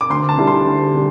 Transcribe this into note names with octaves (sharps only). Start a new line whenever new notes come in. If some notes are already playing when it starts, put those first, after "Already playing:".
D6
D2 C6
A5
D3 G3 E4
C6
D2
D3 G3